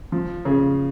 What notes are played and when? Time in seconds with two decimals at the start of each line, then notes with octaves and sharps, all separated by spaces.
0.12 F3
0.45 C#3